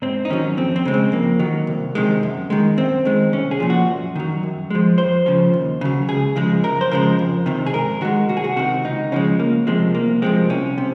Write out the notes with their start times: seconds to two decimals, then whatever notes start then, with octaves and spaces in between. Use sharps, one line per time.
0.02 G#2 C4
0.25 D#4
0.30 D#3 F#3 C#4
0.57 F2 C4
0.76 C4
0.85 C#3 G#3
0.94 C4
1.12 F2 A#3
1.39 D#3 F#3
1.67 C2
1.95 C3 D#3 G#3
2.23 F#2
2.50 D#3 G#3
2.77 F#2 C4
3.05 D#3 G#3
3.33 C2 C#4
3.51 G#4
3.60 A#2 F3
3.70 F#4
3.88 F#2
4.15 D#3 F#3
4.43 F#2
4.70 F3 G#3
4.98 F2 C5
5.26 C#3 F3
5.53 D#2
5.81 C#3 F#3
6.08 C#2 G#4
6.36 C#3 F3 G#3
6.63 F#2 A#4
6.81 C5
6.91 C#3 F3 G#3 A#4
7.19 F2
7.46 C3 D#3
7.66 G#4
7.74 G#2 A#4
8.01 D#3 G#3 F#4
8.29 C2 F#4
8.37 G#4
8.44 F#4
8.56 C3 D#3 F#4
8.84 C#2 D#4
9.12 C#3 F3 G#3 C#4
9.39 C#2 A#3
9.67 C3 F3 G#3
9.95 C2 A#3
10.22 C3 F3 G#3 C4
10.50 C2 C#4
10.78 C3